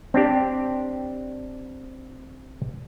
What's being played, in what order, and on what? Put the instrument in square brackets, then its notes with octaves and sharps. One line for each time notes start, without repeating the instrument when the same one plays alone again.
[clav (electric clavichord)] C4 D4 G4